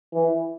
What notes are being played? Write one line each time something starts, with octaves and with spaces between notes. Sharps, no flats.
E3